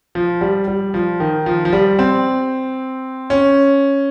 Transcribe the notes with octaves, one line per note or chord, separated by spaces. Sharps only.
F3
G3
G3
F3
D#3
F3
F3
G3
C4
C#4